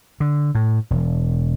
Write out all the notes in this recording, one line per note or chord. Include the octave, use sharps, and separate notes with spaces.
D3
A2
E1